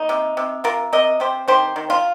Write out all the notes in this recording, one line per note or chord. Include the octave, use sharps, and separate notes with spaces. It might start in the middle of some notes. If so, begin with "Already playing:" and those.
Already playing: A#3 D#4
C3
C3
C3 F4 A#4
C3 A#4 D#5
C3 G4 C5
D#3 G4 C5
D#3
F4